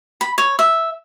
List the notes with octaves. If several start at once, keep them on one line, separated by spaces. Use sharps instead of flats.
B5
C#5
E5